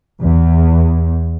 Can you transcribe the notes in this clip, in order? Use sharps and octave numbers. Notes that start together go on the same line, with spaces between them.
E2